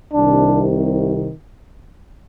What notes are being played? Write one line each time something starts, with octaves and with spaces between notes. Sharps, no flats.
C2 C3 D#3 D4